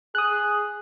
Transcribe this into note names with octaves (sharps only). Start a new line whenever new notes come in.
G#4 D#6 F#6